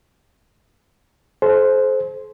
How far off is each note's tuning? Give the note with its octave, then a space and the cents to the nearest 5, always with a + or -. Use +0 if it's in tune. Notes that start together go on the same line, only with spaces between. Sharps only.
A4 -40 C5 +0